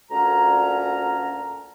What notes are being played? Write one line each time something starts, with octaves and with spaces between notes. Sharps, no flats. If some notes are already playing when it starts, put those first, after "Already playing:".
D2 A#2 D3 C#4 A#5